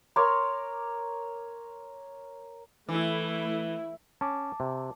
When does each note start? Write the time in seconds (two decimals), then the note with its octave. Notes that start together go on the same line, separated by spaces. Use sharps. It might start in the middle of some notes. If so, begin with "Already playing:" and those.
0.16 A#4 C#5 C6 D6
2.89 E3 A3 E4
4.21 C#4 A5 D6
4.60 C3